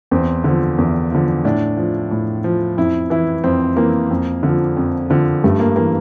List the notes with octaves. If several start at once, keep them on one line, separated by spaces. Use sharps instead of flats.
E2 C4
D3 F3
E2
D3 F3
A2 D4
F3
A2
F3
F2 E4
E3 E4
F2 C4
E3 A#3
F2
D3 F3
F2
D3 F3
G2 A3
A#3
E3 A#3